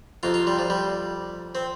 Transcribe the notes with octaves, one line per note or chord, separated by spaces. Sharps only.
F2 C3 F4
F4
G3
F3
G3
C4